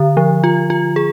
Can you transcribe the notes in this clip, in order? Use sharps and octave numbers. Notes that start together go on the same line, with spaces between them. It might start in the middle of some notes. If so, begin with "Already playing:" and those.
Already playing: D3
F3
F4
F4
G#4